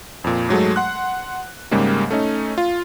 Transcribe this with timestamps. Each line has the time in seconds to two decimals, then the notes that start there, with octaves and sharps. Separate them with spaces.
0.24 F2 A#2
0.49 G#2 F#3 G#3 A3
0.76 F#5 C6 F#6
1.71 G#2 C#3 G3 G#3 A#3
2.11 A3 C#4 D#4
2.58 F4